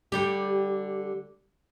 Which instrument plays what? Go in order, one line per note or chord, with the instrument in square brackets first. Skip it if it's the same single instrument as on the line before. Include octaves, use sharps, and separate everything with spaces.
[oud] D3 G3 G4